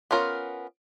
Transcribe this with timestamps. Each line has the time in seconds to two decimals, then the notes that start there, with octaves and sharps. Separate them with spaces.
0.11 B3 C#4 F4 A#4